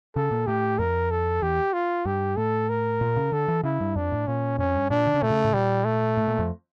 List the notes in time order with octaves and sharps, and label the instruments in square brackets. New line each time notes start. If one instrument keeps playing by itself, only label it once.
[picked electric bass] C#3 [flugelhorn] A4
[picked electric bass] A#2
[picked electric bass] A2 [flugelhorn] G4
[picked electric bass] F2 [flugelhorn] A#4
[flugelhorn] A4
[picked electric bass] E2 [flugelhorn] G4
[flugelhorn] F4
[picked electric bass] G2 [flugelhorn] G4
[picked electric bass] A2 [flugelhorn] A4
[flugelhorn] A#4
[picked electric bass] A#2
C#3
[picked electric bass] D3 [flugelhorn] A4
[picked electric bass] E3
[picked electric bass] C#3 [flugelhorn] E4
[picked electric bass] G2
[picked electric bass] F2 [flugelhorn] D4
[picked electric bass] A2
[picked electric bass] A#2 [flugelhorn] C#4
[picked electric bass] F2 [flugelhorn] C#4
[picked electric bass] G2
[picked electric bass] A#2 [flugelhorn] D4
[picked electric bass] D3
C#3
[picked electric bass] A#2 [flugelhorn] A3
[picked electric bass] C#3
A2
[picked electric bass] A#2 [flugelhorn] G3
[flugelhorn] A3
[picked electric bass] A2
A#2
F2